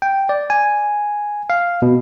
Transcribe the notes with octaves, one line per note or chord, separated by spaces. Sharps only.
G5
D5
G#5
F5
B2